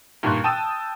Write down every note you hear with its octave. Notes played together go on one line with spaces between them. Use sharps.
G2 A#2 D#3 C6 C#6 F#6
G5 A5 D#6 E6 D#7 E7